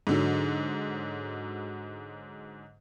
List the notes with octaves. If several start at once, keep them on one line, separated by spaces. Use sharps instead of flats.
G#2 D3 F#3